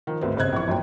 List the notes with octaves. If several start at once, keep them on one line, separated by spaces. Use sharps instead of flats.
D#3 F3
G#1 D2 B3 C4
G1 C#3 C4 D#5 F#6 G#6
A#1 E3 C#6
G1 F#2 A#2 G5